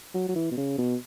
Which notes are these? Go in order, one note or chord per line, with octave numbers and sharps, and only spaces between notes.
F#3
F#3
E3
B2
C#3
B2